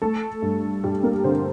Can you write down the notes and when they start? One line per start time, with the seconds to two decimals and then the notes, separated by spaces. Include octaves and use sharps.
0.02 A3 A4
0.42 G2
0.84 G2 G3 G4
1.03 A#3 A#4
1.24 D3 C4 C5